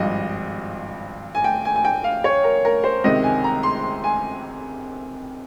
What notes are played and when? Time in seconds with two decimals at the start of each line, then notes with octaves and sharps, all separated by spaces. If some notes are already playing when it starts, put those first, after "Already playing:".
Already playing: G#1 G2 F3 D#5
1.35 G#5
1.44 G5
1.65 G#5
1.76 G#5
1.85 G5
2.04 F5
2.24 C#5
2.44 A#4
2.65 A#4
2.84 C5
3.04 C#2 C3 D#3 D#5
3.24 G#5
3.44 A#5
3.63 C6
4.04 G#5